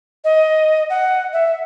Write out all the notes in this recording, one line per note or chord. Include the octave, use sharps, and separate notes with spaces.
D#5
F#5
E5